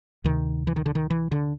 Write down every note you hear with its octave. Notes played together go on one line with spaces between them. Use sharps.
D2 C3 D#3
E3
D#3
D3
D#3
E3
D3